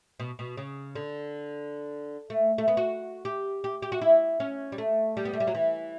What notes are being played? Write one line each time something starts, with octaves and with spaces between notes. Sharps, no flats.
B2
B2
C#3
D3
A3
A3
B3
F#4
G4
G4
G4
F#4
E4
C#4
G3
A3
G3
B3
A3
G3
F#3
E3